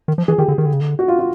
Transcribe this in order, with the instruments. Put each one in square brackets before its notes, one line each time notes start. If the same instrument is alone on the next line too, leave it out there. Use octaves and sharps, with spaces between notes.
[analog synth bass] D#3
F3
[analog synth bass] E3 [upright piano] G#4
[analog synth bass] D#3 [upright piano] G4
[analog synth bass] D3
D#3
D3
C#3
D3
[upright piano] F#4
F4
F4